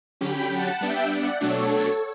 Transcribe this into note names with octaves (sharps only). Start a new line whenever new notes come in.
D3 F#3 C#4 G4 G5 B5
F#5 A5
G3 B3 D4 E5 G5
D5 F#5
B2 F#3 A3 D4 A4 C#5